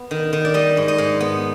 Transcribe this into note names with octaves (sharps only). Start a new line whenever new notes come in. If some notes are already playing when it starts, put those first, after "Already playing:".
Already playing: B3
D#3
D#3
D5
G3 D#5
G#2
D#5
G#2
B3